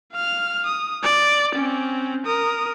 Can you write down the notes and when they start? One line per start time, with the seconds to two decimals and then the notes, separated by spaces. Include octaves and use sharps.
0.12 F5 F6
0.66 D#6
1.03 D5
1.55 C4 C#4
2.26 A#4 D#6